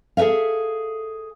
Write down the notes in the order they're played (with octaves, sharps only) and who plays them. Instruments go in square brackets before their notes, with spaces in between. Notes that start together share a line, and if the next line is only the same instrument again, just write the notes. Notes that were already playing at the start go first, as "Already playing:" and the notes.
[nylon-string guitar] G#4 A4 B4 E5 F5